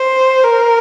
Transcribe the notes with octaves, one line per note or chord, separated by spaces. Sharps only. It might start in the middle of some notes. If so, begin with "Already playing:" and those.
Already playing: C5
A#4